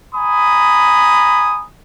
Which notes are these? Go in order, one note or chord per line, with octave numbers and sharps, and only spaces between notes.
G#5 A#5 B5 D#6